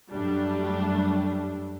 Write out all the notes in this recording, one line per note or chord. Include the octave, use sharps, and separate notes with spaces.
F#2 G3 A3 D4